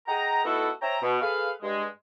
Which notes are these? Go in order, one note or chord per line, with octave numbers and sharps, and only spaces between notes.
G#4 D#5 F#5 G5 A#5
A3 B3 D#4 E4 F#4 A4
C5 C#5 E5 G5 A#5
B2
G#4 A4 B4 F5
G2 G#3